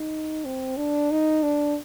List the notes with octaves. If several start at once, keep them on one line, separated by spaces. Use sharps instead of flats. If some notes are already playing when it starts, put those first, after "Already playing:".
Already playing: D#4
C4
D4
D#4
D4